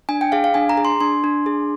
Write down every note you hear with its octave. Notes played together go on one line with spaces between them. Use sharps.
D4 G#5
G5
G#4 F5
F5
D4 G#5
A#5
G#4
C6
D4 C6
D4
G#4